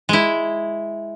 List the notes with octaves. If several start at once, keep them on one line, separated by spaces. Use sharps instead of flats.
G#3 E4